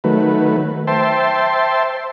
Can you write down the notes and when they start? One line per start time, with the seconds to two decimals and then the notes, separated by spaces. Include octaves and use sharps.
0.04 D#3 F#3 A3 B4
0.87 C5 E5 G5 A5 C6